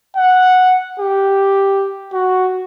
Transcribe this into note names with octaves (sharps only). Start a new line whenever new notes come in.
F#5
G4
F#4